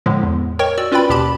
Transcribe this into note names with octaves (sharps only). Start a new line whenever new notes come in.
A2 D3 F3 G#3
E2
A#4 C#5 D#5 G5 C#6
F#4 D5 E6
C#4 F4 B4 D5 G5 B5
D#2 B2 G4 A5 B5